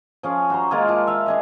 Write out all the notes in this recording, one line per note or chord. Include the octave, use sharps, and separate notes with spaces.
F3 C#4 G#4
F#4 C5 A#5
G#3 A#3 F4 G#4
F4 A5
E5 F5
D4 G#4 D#5